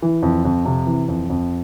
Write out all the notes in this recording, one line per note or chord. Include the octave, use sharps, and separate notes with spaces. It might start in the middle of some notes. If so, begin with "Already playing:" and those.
E3
F2
F2
C3
E3
F2
F2